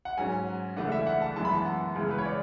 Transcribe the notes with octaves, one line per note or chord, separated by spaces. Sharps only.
F#5
G#2 F#3 C#4 G#5
C#2 C#3 E3 A3 D4 F#5
E5
F#5
A5
F#2 E3 G#3 B3 A5
B5
A5
F#5
C#2 C#3 E3 G#3
B4
C#5
D5